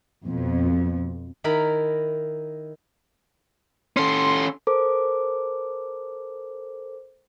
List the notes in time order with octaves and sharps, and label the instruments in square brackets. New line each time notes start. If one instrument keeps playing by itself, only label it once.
[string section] F2 B2
[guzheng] D#3 E4 A#4 B5
[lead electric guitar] C#4 A4 [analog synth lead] C6
[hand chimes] A4 A#4 C5 D6